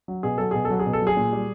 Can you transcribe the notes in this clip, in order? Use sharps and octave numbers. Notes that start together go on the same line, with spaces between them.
F#3
B2 G#4
F#3 A4
B2 G#4
A4
F#3
G#4
B2
A4
F#3
G#4
A#2
G3